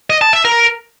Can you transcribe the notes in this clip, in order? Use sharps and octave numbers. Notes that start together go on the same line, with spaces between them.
D#5
A5
E5
A#4